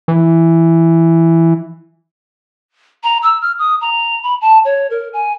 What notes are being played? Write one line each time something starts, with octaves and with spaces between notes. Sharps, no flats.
E3
A#5
E6
F6
D#6
A#5
B5
A5
C#5
A#4
G#5